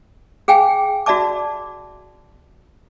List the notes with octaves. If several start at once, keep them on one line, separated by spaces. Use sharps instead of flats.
G#4 F5 G5 G#5
F#4 D5 E5 A5 D6